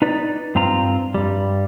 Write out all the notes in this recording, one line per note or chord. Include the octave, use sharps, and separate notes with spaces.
D#4 B4 D5
G2 C4 F4 A#5
G2 G3